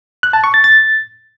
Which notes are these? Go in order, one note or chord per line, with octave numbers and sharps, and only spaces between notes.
F#6
A5
C#6
A6
A6